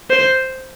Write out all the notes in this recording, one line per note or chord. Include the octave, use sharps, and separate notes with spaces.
C5